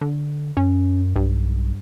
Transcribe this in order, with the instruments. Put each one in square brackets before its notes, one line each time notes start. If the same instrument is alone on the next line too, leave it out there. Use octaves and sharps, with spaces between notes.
[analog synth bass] D3
[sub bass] F#2 [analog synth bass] C#4
[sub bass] B1 [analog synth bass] G2